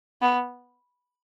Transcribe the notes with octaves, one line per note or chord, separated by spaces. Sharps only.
B3